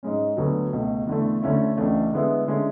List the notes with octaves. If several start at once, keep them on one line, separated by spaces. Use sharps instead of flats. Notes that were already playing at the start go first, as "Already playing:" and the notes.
G#2 G#3 C#4
D2 D3 F#3 B3
C#2 B2 A3
E2 D3 A3
D2 D3 A3 C#4 E4
C#2 C#3 E3 A3 D4
D3 G#3 B3 E4
D3 G#3 C#4 E4